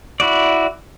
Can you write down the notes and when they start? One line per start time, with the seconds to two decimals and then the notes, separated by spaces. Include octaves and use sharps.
0.20 E4 F#4 D5